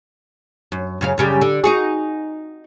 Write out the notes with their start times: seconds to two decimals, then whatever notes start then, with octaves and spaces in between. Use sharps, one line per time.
0.72 F#2
1.01 F#2 C#3 F5
1.18 F#2 C#3 G3
1.41 D3
1.64 D#4 F#4 G#4